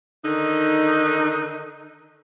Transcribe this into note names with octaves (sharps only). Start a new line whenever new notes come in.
D3 D#3 D#4